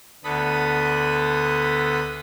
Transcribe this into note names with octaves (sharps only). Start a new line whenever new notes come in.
D2 D3 B3 A4 B5 D#6